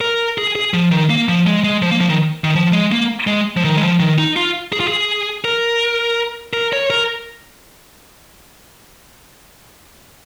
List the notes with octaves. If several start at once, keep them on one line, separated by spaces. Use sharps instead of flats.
A#4
G#4
G#4
F3
D#3
A#3
F3
G#3
G#3
F3
A#3
F3
D#3
D#3
F3
G#3
A#3
G#3
F3
D#3
G#3
F3
D#3
D#4
F4
G#4
F4
G#4
A#4
A#4
C#5
A#4